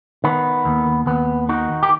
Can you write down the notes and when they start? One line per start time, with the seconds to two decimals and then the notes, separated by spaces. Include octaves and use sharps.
0.24 D#3 B3
0.65 D#2
1.06 D#2 B3
1.49 D#3 D#4 F#4
1.83 G4